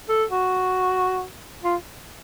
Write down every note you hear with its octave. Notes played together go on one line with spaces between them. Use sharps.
A4
F#4
F4